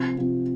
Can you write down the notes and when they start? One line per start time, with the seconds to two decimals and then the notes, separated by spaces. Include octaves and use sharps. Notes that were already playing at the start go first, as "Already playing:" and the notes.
Already playing: C3 F3 C4
0.17 C3 F3 C4